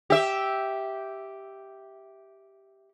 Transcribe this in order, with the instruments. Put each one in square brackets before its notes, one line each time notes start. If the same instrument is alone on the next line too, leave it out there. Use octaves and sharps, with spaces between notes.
[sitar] G4 E5